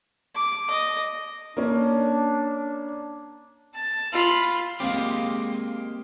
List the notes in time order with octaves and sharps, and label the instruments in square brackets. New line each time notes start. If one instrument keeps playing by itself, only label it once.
[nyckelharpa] D6
D#5
[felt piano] A#3 C#4 [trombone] D4
[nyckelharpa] A5
F4 B5
[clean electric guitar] G#3 A#3 G4 [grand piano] C4 F5